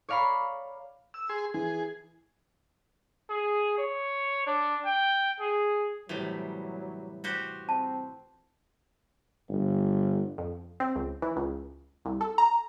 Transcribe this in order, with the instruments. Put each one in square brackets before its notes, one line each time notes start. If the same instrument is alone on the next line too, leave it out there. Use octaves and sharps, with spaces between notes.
[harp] C#5 D5 F5 A#5 B5
[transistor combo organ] E6
G#4 C6
[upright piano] E3 [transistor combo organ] G#4
[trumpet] G#4
C#5
D4
G5
G#4
[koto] A2 C3 [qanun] E3 G3 [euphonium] F#3
[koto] F#4 G4 C5
[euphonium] C4 [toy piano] A5
[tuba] G1
[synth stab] F2
C4
C#2
E3
C#2
C2
A4
A#5